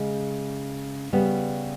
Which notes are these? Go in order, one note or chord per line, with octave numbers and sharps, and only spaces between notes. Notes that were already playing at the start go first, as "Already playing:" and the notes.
Already playing: C#3 G#3
C#3 G3 B3